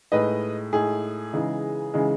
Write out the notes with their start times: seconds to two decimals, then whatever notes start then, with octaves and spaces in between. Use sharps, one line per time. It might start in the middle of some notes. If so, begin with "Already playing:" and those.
0.12 A2 G#3 D#4 B4 D#5
0.73 A2 G#3 D#4 G#4
1.33 C#3 E3 G#3 D#4
1.93 C#3 E3 G#3 D#4